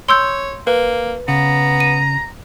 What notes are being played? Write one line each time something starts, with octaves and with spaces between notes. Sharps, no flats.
C#5 C6 E6 G6
A#3 B4
C#3 B3 A#5
D#7